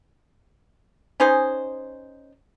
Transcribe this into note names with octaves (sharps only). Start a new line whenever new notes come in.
C#4 D#4 G#4 C5